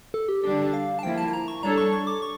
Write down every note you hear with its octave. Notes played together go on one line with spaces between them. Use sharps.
A4
G4
D3 G3 D4 G4
F5
A5
F3 A#3 E4 G5
A5
A5
A#5
C#6
G3 D4 A4 C#5 A#5
C#6
C#6
D6
C#6